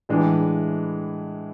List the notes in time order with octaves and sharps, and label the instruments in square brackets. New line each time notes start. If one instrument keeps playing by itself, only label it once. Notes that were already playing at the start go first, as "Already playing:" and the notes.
[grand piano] A2 E3 G#3 D4